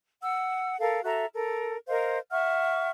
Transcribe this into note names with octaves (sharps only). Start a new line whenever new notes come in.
F#5 E6
A4 A#4 F5
F#4 A4 E5 A#5
A4 A#4
A#4 C5 D#5 F5
E5 F#5 C#6 F6